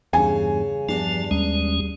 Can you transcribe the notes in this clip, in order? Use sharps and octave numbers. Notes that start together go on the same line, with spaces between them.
E2 G2 C#3 G#5
E2 G2 F3 D4 A5
D#2 G3 G#3 C#4